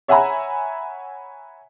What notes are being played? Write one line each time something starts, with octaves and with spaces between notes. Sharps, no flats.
C#5 E5 F#5 G#5 A#5 B5